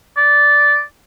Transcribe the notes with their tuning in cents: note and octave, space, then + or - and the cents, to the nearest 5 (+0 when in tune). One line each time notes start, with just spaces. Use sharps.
D5 -10